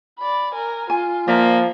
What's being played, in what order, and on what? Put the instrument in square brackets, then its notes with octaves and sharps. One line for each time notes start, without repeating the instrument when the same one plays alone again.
[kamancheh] D5 B5
A#4 G#5
[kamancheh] F4 [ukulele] G#5
[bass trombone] F3 [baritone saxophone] A#3 [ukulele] D5 E5 A#5